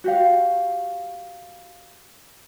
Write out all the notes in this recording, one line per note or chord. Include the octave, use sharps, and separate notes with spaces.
F#4 G4 F5